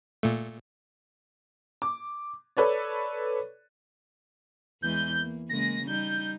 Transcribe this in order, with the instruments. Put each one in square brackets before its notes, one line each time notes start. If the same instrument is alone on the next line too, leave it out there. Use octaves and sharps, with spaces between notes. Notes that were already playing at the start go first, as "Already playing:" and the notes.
[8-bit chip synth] A#2 A3
[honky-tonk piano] D6
A4 B4 C#5 D5
[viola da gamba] E2 E3 G#3 [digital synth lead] G6
[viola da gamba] A#3
[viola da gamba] C#3 G#3 A#3 [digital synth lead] A#6
[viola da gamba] G3 D#4 [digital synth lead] G6